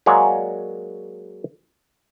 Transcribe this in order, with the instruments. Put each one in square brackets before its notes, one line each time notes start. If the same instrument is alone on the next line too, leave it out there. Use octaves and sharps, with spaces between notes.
[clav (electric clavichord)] F#3 G#3 A#3 C#5 D5